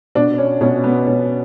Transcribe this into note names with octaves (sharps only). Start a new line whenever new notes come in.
B2 D4
C#4
B2 C#4
B3
B2 C#4